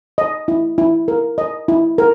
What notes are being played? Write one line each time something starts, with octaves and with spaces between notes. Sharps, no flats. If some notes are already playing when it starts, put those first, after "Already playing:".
D#5
E4
E4
A#4
D#5
E4
A#4